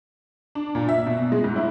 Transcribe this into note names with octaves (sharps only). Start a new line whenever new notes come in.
D4
A#2
E5
B2
G#3
G#2
E4